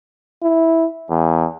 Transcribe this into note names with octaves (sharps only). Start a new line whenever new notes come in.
E4
E2